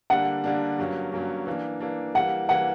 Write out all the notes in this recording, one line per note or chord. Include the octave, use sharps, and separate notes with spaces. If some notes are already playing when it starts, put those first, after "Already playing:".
D3 G3 A#3 D4 F#5
D3 G3 A#3 D4
G2 F#3 A#3 C#4
G2 F#3 A#3 C#4
E3 A#3 D4
E3 A#3 D4
E3 G3 A#3 F#5
E3 G3 A#3 F#5